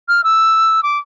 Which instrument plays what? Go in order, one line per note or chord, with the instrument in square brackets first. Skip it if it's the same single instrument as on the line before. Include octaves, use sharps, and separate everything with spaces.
[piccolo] F6
E6
D6